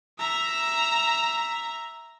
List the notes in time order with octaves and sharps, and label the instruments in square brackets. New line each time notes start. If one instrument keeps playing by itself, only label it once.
[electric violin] E5 A#5